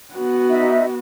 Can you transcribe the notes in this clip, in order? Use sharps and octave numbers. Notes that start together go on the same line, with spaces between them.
B3 F#4
D#4 E5